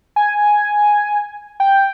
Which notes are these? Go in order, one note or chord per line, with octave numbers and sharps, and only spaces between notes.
G#5
G5